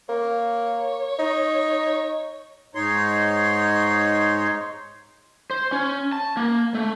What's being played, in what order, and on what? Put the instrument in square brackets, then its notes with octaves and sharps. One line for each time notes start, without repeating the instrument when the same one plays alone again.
[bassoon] A#3 [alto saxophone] C#5
[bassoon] D#4
[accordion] G#2 D#4 C#5 C6
[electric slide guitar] C5
C#4
A5
A#3
A3